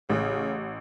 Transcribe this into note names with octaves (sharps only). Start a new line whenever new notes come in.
A1 C#3